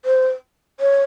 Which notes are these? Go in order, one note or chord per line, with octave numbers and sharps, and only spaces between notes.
C5
C#5